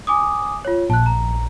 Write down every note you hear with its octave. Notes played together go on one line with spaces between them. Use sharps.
G#5 D6 D#6
F4 C#5
A#1 A5 F#6
A#5